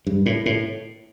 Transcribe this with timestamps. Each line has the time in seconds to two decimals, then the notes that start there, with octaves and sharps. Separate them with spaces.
0.07 G2
0.26 A2
0.46 A2